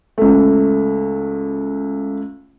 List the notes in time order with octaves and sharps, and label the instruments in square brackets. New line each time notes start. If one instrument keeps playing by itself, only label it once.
[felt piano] C#2 A3